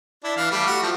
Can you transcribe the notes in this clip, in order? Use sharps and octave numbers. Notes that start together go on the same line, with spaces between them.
D4 E4
E3 F5
G3 A3
F#4
F3 A3